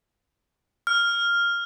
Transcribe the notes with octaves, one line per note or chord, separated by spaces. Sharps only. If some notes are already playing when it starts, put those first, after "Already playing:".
F6